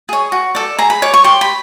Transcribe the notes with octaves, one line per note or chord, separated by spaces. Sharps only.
G#4 C#5
F#4
A4 D5
G#4 A#5
B5
C#5 D6
C#6
G4 C6
B5